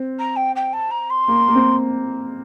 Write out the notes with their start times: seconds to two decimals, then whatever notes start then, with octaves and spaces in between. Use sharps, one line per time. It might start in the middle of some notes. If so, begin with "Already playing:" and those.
Already playing: C4
0.19 A#5
0.36 G5
0.56 G5
0.73 A5
0.91 A#5
1.10 C6
1.28 A#3
1.48 A#3
1.55 C4